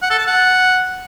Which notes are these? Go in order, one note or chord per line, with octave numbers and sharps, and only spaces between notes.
F#5
A4
A5
F#5